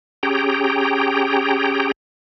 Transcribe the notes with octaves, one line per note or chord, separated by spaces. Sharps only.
C#4 G4 G#4 G5 A#5